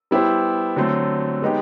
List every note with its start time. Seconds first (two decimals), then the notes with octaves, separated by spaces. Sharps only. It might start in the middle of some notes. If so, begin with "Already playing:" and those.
0.11 G3 B3 E4 G4 C5
0.76 D3 F#3 A3 C4
1.42 G#3 B3 D#4 G4